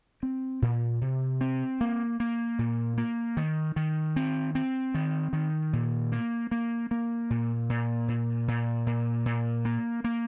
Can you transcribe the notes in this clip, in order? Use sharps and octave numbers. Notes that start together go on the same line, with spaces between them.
C4
A#2
C3
C4
A#3
A#3
A#2
A#3
D#3
D#3
C4
C4
D#3
D#3
A#2
A#3
A#3
A#3
A#2
A#2
A#2
A#2
A#2
A#2
A#3
A#3